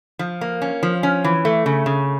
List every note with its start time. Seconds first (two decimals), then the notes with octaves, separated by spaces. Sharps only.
0.19 F3
0.41 A#3
0.62 C#4
0.83 F3
1.03 C#4
1.24 E3
1.45 A3
1.66 C#3
1.86 C#3